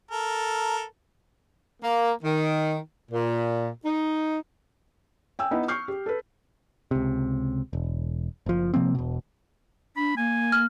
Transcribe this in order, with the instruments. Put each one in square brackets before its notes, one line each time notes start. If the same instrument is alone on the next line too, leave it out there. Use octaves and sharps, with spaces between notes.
[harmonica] A4 A#4
[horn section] A#3
D#3
A#2
D#4
[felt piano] G5 G#5 E6
B3 D#4 E4
C#6 F6 G6 C7
G4
A4 B4
[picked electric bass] C#2 C3
E1
F#1 F3
C3 F3 A#3 C4
E1 B2
[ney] D4 [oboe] B5
[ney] A#3 [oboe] G#5
[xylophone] F6